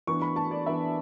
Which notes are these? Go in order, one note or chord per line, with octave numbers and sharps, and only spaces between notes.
E3 B3 D4 C#6
B5
A5
D5
E3 B3 D4 E5